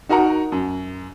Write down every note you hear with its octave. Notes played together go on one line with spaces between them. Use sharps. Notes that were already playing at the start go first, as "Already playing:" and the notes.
D#4 F#4 A#4 F#5 A#5
F#2